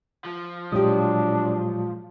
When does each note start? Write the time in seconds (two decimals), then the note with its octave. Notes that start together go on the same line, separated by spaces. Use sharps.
0.25 F3
0.72 A#2 F#3 G#3 D4 G4 D#6